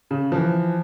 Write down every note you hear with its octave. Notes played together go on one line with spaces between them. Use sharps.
C#3
E3 F3